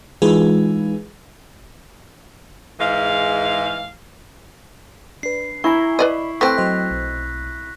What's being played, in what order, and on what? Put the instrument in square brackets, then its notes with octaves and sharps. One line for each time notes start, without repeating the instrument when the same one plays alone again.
[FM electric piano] E3 G#3 D#4 F4 G#4 B4
[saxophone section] G#2 E3 G#3 F5
[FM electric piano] D4 B4 [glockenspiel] C7
[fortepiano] E4 [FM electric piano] G#5 A#5 B5 [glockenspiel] C#6
[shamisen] B4 D5 D#5 [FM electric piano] B5
[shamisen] A3 C4 [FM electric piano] B4 G5 [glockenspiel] F#6 A#6 B6
[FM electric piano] F#3 C5 D#5
B1